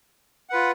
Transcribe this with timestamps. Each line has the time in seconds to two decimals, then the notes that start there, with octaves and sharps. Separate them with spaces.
0.49 F4 B4 F#5